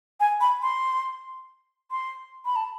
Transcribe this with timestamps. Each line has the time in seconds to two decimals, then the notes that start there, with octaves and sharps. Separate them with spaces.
0.20 G#5
0.41 B5
0.62 C6
1.91 C6
2.45 B5
2.56 A5